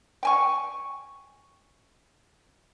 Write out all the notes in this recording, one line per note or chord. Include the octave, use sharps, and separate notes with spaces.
G5 G#5 C#6